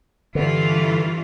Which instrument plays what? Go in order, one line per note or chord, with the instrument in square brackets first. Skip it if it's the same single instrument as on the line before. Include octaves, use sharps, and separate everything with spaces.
[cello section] G2 E3 F4 [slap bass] D3